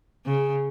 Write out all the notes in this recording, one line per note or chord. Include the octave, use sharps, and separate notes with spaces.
C#3